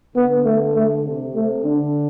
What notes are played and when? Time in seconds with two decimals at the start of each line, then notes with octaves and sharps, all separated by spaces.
0.15 D3 B3
0.45 A3
0.74 A3
1.05 C3
1.35 C3 A3
1.64 D3 D4